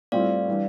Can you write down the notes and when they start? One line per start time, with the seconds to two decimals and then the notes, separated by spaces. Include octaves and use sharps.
0.12 A2 G3 C4 F4 D5 F5
0.48 E3 G3 D4